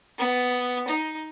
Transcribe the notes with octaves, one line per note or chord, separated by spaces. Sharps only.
B3
D#4